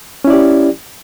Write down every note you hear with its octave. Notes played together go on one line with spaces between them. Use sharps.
C#4 E4 G4 D5